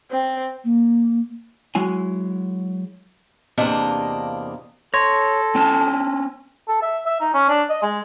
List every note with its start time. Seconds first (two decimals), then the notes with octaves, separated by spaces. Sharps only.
0.11 C4
0.64 A#3
1.75 F#3 G#3 E4 G#5
3.58 E2 C3 A#3 D4 D#5 F5
4.94 A4 C#5 C6 G#6 A#6
5.55 C4 C#4 A5
6.68 A4
6.82 E5
7.06 E5
7.21 D#4
7.34 C#4
7.49 D4
7.70 D#5
7.82 G#3